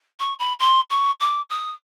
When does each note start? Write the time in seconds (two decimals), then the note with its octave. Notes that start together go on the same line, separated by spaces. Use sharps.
0.20 C#6
0.39 B5
0.60 C6
0.90 C#6
1.20 D6
1.50 D#6